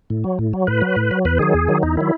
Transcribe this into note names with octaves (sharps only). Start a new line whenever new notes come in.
A2
F#3
A2
F#3
A2 B4
F#3
A2
F#3
E2 B4
D#3 F#3 G#4
E2
D#3 F#3
E2 D#4
D#3 F#3 E4